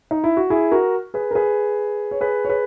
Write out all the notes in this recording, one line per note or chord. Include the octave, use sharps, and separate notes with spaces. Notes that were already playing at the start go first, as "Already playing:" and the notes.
D#4
E4
F#4
E4 G#4
F#4 A#4
G#4 B4
A#4
G#4 B4
C#5
G#4 B4
C#5
G#4 B4